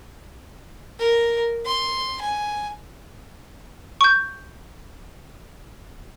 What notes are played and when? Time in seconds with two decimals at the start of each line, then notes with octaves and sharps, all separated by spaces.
0.99 A#4
1.65 C6
2.21 G#5
4.01 C#6 G6